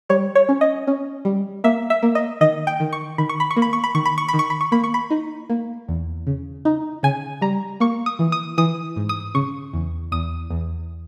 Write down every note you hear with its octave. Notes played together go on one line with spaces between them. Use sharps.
G3 C#5
C#5
C#4
D#5
C#4
G3
A#3 E5
E5
A#3
D#5
D#3 D#5
G5
D#3
C#6
D#3 B5
C#6
B5
C#6
A#3
B5
C#6
B5
D#3 C#6
B5
C#6
B5
D#3
C#6
B5
C#6
A#3 B5
C#6
B5
D#4
A#3
E2
C#3
D#4
C#3 G#5
G3 A#5
A#3 C#6
D#6
E3
D#6
E3 D#6
G#2
D#6
C#3 C#6
E2
E2 D#6
E2